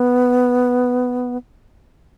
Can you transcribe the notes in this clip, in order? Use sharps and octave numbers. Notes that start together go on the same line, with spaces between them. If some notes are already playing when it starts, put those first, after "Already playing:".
Already playing: B3